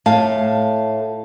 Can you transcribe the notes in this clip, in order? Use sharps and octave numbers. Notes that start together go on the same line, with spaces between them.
A2 F5 A5